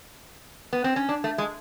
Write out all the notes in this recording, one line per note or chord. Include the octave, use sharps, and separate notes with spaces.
B3
C4
C#4
D4
A3
G#3